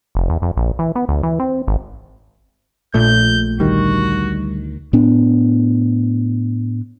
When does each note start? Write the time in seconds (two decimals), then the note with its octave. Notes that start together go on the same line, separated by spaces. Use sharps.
0.15 F1
0.30 E2
0.42 F2
0.57 A#1
0.79 E3
0.96 B3
1.09 D2
1.23 E3
1.40 C4
1.68 G#1
2.94 A#1 A#2 A3 G6
3.60 D2 D#3 G3 F#4
4.93 A2 B3 D4